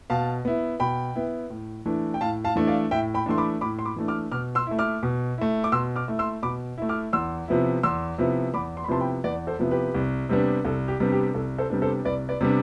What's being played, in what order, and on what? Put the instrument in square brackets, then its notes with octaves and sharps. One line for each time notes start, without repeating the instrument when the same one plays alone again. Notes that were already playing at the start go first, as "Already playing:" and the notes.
[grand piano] B2 F5 A5
B3 E4
B2 G5 B5
B3 E4
A2
E3 A3 D4
G5
A2 F5 A5
F5 A5
E3 A3 D4
D5 F5
A2 E5 G5
G5 B5
E3 A3 D4 C6
B5 D6
A2 B5 D6
C6
B5 D6
E3 A3 D4
D6 F6
B2 D6 F6
C6 E6
A3 E4
D6 F6
B2
A3 E4
D6
B2 C6 E6
D6 F6
A3 E4
C6 E6
B2 B5 D6
A3 E4
D6 F6
E2 C6 E6
C3 F3 B3 E4
E2 C6 E6
C3 F3 B3 E4
E2 B5 D6
C6
B5
C3 F3 B3 E4 A5 C6
G5 B5
E2 B4 D5
A4 C5
C3 F3 B3 E4
G4 B4
C2
C3 G3 B3 D4
C2 A4
G4
C3 G3 B3 D4
G4
C2 A4
A4 C5
C3 G3 B3 D4
A4 C5
C2 B4 D5
B4 D5
C3 G3 B3 D4